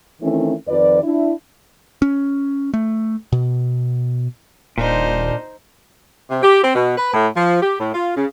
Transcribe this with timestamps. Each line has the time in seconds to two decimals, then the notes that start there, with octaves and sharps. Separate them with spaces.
0.22 D#3 E3 A3 C4 C#4 E4
0.68 F2 D#3 F3 B4 D5
1.03 D4 E4
2.02 C#4
2.74 A3
3.32 B2
4.78 D#1 A#2 D4 D#4 C5
6.30 C3
6.42 G4
6.63 C4
6.75 B2
6.98 B4
7.13 A2
7.35 F3
7.61 G4
7.79 A2
7.94 F4
8.16 C#3